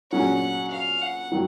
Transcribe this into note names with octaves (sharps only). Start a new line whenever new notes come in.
A#2 F#3 C#4 G#4 F#5
F5
F#5
D#3 F#3